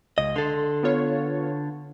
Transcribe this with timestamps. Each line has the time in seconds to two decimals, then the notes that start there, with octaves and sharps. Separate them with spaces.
0.18 C#2 D#5
0.36 D3 A4 C6
0.83 B3 F4 C#5